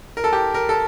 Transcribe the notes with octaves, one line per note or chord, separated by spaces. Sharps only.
A#4
A4
G4
A#4
A4